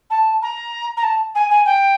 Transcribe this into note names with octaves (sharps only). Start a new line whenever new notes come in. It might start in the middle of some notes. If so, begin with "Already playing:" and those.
A5
A#5
A#5
A5
G#5
G#5
G5